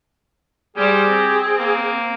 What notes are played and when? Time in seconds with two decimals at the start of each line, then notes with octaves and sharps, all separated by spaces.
0.76 G3 G4 G#4 C5
1.08 C4
1.57 A#3